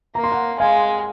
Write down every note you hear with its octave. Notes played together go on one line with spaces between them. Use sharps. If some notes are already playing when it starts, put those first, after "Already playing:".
A#3 A#5
C6
F#5 A#5
G#3 F5 G#5